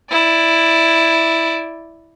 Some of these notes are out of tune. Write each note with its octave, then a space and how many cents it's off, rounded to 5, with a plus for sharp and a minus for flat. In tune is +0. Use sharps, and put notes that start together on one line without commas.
E4 +0 D5 +0